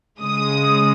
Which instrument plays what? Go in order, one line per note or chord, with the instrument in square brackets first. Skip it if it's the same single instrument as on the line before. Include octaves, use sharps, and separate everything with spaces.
[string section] C#3 G#3 D#6